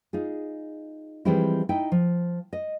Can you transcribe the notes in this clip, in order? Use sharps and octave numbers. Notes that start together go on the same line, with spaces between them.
D#4 F4 G#4
E3 F3 G3 G#3 C4 E4
D#4 E4 G5
F3
D#5